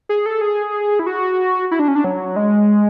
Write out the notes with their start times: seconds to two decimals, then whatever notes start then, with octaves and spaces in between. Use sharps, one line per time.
0.09 G#4
0.26 A4
0.41 G#4
0.99 E4
1.07 F#4
1.71 E4
1.79 D4
1.88 C#4
1.96 D4
2.04 F#3
2.36 G#3